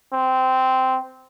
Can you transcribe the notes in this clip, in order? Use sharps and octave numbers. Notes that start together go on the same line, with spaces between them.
C4